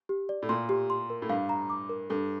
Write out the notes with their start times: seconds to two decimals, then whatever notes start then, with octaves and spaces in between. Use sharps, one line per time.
0.09 G4
0.29 D5
0.42 A2
0.49 A#2 C6
0.69 G4
0.90 C6
1.10 A#4
1.22 A2
1.29 G2 F5
1.49 A#5
1.70 D6
1.89 A#4
2.10 G2 A4